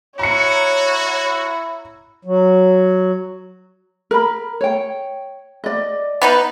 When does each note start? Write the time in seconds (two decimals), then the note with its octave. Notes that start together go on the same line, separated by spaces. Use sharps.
0.19 E4 F#4 C#5 A#5 C#7
2.25 F#3
4.11 A#4 B5
4.61 C#5 G5
5.64 D5 D#5
6.22 B3 D#4 B4